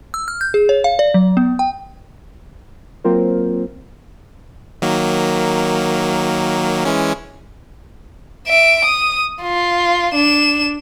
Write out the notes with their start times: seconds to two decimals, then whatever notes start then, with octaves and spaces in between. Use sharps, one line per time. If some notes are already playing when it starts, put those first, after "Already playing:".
0.14 E6
0.28 F6
0.41 G6
0.54 G#4
0.69 C#5
0.84 F5
0.99 D5
1.14 F#3
1.37 B3
1.59 G5
3.04 F#3 A#3 C4 F4 A#4 C5
4.82 D#3 F#3 A#3
6.85 E3 G#3 C#4
8.47 E5 D7
8.85 D#6
9.42 F4
10.15 D4 E7